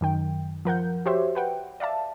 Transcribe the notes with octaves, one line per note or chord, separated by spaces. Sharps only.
F#2 D#3 G5
F3 A#4 F#5 G6
F#4 G4 C5 C#5 E5
B4 F#5 G5
D5 E5 F5 A5